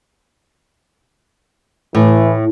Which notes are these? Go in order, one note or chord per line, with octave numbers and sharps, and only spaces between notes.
A2 E3